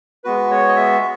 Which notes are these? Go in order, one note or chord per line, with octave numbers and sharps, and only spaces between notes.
G#3 B3 F#4 B4
C#5
D#5
E5
F#4